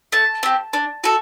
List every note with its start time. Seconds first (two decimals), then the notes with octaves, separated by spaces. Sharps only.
0.12 A3 A5
0.43 C4 G4
0.73 D4
1.04 F#4 A4